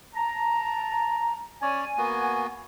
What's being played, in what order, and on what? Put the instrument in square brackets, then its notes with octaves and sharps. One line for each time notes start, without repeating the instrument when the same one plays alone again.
[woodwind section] A5 A#5
[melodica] C#4 C#5 D5 [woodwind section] G#5
[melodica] A#3 B3 F#4